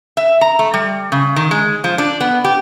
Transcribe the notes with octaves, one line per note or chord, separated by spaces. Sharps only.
E5
A#5
A3
G3
C#3
D#3
G#3
F3
D4
B3
G4